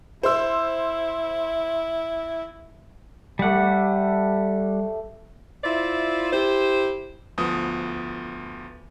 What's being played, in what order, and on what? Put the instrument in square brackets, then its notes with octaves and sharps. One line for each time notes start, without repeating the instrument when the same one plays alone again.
[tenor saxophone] E4 [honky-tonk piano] C5 E6
[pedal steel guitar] G3 F#5 [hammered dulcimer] A3 G4
[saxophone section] E4 F4 C5 D5 E5
E4 G4 C5
[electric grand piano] D2 F3 B3 [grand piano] D#6